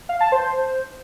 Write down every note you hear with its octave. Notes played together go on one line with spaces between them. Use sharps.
F5
A5
C5